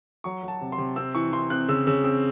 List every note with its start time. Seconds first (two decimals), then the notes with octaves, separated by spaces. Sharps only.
0.24 F#3 C#6
0.43 F#3 A5
0.61 C3
0.72 C6
0.78 C3
0.96 C4 E6
1.15 E3 C#6
1.32 E3 C6
1.50 C4 F#6
1.68 C#3 E6
1.87 C#3 E6
2.04 C4 E6